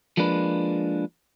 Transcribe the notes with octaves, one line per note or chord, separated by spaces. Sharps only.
F3 G#3 A#3 D4 B4